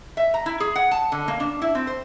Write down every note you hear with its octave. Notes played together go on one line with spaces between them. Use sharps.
E5
A#5
E4
G#4
F#5
A5
D3
A#3
D4
E4
C4
C5